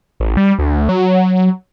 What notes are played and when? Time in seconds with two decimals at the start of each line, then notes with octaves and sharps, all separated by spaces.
0.20 A1
0.37 G3
0.59 D2
0.89 F#3